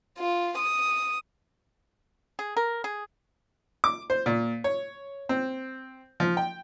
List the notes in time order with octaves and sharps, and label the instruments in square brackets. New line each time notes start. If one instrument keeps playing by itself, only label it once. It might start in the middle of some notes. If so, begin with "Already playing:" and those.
[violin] F4
D#6
[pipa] G#4
A#4
G#4
[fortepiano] D6
C5
A#2
C#5
C4
F3
G5